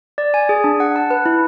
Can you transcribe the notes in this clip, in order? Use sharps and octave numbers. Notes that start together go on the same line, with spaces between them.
D5
G#5
G#4
D4
F#5
A5
B4
E4